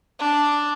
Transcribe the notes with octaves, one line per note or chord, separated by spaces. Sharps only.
D4